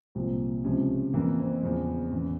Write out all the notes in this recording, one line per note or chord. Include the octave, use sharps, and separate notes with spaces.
C2 A#2 F3 C4
C#2 C3 F3 C#4
F2 E3 A#3
C4
E2 C#3 F3
E2 E3 C#4